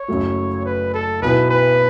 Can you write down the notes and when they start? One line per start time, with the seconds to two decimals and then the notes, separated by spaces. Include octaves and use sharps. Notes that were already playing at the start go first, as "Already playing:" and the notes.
Already playing: C#5
0.08 F#1 F#2 C#3 F#3 A3
0.65 B4
0.94 A4
1.22 B1 B2 B3 E4 B4
1.51 B4